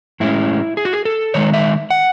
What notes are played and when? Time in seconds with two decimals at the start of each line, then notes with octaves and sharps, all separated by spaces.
0.20 A2 G#3 C#4 E4
0.77 G#4
0.85 F#4
0.93 G#4
1.05 A4
1.34 D#3 G#3 D#4 C#5
1.53 E5
1.90 F#5